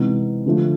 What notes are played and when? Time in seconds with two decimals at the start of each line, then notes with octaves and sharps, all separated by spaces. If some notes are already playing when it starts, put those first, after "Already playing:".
Already playing: C3 E3 G#3 B3 D#4
0.46 D3 F3 A3